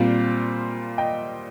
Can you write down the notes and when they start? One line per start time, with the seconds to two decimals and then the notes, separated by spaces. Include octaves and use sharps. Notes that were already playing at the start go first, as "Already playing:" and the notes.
Already playing: A#2 G3 C4 F4
0.98 D#5 G5